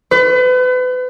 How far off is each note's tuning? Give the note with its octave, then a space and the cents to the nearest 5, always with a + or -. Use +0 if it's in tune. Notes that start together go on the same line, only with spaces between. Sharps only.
B4 +35